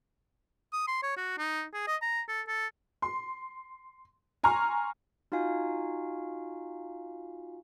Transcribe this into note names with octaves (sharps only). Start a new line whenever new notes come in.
D#6
C6
C#5
F#4
D#4
G#4
D#5
A#5
A4
A4
C6
G#5 A#5 C6 C#6 F6
D#4 F4 F#4 F5 G#5